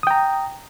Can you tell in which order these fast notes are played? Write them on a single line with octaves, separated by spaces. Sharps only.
D#6 G5 A#5